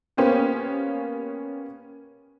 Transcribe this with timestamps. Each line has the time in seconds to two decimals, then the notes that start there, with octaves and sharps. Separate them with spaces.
0.17 A#3 B3 C#4 G4 C5